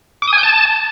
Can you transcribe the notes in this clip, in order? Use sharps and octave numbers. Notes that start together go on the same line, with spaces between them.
D6
D#6
G#5
G6
A5